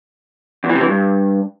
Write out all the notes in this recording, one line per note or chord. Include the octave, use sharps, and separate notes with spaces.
E2
E3
C3
E3
G2